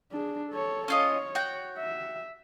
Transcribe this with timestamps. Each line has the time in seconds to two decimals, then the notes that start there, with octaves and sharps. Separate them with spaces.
0.12 D4 G#4
0.50 A4 C#5
0.88 C#4 F4 C#5 D#5
1.35 F#4 G5
1.78 E5